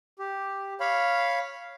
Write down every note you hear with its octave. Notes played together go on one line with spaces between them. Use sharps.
G4
C#5 F5 B5